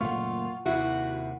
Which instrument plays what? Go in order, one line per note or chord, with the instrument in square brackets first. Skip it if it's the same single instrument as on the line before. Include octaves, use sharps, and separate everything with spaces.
[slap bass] F#1 A#2 A3 [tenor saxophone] F4 [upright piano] F5 [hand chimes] F#5 C#6
[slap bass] D#2 C3 [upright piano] E4 [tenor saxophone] F#4 [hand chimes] F#5